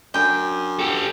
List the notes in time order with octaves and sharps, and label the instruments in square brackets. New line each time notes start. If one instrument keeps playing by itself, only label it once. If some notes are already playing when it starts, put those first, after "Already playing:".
[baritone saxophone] F#2 [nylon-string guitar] D4 G#5 [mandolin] G5
[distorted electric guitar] G4 A4